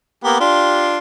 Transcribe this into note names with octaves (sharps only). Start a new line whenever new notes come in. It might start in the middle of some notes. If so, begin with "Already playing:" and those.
A#3 B3 G4
D4 F4 G4